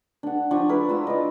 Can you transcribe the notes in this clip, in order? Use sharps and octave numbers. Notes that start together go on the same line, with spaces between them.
D4 F#5
F3 D4 A5 C#6
E4 A#4 B4
D4 F4 E6
D5 D#5